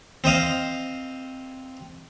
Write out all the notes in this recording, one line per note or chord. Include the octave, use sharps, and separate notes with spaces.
C4 C5 D#5 F5